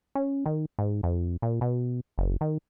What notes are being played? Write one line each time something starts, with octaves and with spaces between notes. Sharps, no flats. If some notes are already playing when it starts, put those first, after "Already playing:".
C#4
D#3
G#2
F2
A#2
B2
F#1
D#3